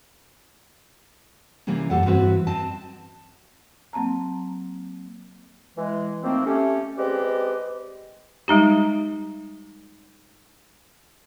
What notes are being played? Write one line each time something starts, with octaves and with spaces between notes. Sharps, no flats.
C3 E3 G3 A#3 C#4
F#2 A#2 G4 A4 F#5
G2 E3 C4 F#4 B4
C4 D#5 A5
F#3 A#3 C4 A5 A#5
E3 G#3
D#3 F3 A3 A#3 C4
A3 C#4 G4
G#3 C4 G4 B4 D5 D#5
G3 G#3 D#4 G4